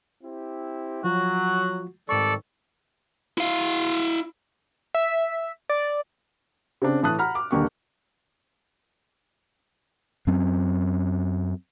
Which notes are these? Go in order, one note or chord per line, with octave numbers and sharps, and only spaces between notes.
C4 E4 G4
F3 F#3 F4 F#4
G#2 D#3 G3 C4 A4 D5 C#6
E4 F5
E5
D5
C#3 C4 D4
A2 E3 A5 D#6 F#6
F#5 A#5 B5 F6
D6
D#1 D3 A#3 G4 C#6
F#2 F#3 C4 C#4